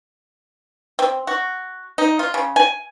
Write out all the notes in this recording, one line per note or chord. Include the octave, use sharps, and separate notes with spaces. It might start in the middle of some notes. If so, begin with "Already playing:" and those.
C4
F#4
D#4
F4
C#3
G#5